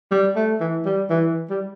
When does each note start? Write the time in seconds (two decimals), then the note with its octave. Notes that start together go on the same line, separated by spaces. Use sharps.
0.11 G3
0.36 A3
0.60 E3
0.86 G3
1.10 E3
1.50 G3